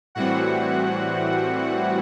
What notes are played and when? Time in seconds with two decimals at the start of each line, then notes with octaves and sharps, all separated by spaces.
0.15 A2 E3 G3 C4 F#4 F#5